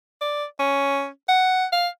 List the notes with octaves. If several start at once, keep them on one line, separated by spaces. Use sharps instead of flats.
D5
C#4
F#5
F5